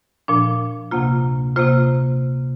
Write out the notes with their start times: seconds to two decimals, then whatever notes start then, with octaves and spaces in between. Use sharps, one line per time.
0.28 A#2 F3 D4
0.91 D2 C3 A#3 F4
1.56 C3 A#3 F4 C5